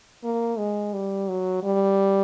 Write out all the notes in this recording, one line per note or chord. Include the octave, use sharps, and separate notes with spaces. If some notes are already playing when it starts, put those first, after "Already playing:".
A#3
G#3
G3
F#3
G3